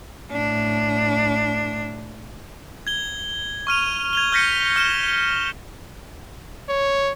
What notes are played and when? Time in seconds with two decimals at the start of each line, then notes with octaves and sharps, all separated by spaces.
0.32 A2 D4
2.87 G#6 G7
3.67 C#6 F6 D#7 F7
4.13 G#6 F7 G7
4.32 F6 G6 A#6 B6 C#7 D#7
4.52 B6
4.76 F6 E7 G7
6.69 C#5